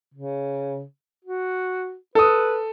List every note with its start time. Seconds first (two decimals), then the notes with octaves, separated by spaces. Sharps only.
0.14 C#3
1.25 F#4
2.15 A4 B4 D#6